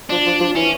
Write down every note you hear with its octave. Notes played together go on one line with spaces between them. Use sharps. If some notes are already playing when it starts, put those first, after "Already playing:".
F3 D4
F3
F3
E3 C#4